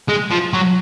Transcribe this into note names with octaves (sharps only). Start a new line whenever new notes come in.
G#3
F3
F#3